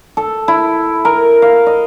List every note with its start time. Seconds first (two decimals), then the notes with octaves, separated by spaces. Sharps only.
0.17 A4
0.48 E4
1.05 A#4
1.42 F5
1.66 D#5